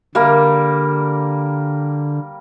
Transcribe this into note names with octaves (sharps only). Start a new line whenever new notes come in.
D3 G3 A#3